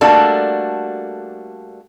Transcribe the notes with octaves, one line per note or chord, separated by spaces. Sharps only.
G3 A3 A#3 D4 F#4 A4